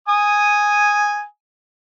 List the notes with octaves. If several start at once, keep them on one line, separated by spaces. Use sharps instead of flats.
G#5 D#6